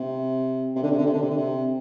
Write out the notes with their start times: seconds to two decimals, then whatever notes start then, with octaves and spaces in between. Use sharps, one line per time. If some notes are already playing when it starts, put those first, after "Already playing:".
Already playing: C3
0.76 C3
0.83 D3
0.91 C3
0.98 D3
1.06 C3
1.13 D3
1.22 C3
1.30 D3
1.37 C3